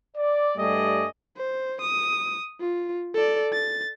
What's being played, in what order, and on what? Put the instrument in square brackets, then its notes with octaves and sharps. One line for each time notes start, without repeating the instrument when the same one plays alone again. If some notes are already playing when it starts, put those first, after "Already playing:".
[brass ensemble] D5
G2 G3 A3 G#4 D5 D#5
[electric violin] C5
D#6
F4
A4 D5
A6